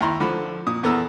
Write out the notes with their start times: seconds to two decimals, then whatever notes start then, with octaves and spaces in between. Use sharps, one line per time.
0.01 D#2 E4 A#5 C6
0.20 D3 F3 B5
0.67 A#2 D#6
0.83 E2 B3 A4 A#5 E6